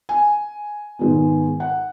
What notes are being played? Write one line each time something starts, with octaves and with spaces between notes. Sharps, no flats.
G#5
G#2 D#3 G#3 B3
F#5